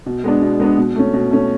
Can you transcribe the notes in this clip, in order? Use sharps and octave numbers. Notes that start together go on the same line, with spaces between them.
B2
G#3 B3 D4
B2
G#3 B3 D4
B2
A3 C#4
B2
A3 C#4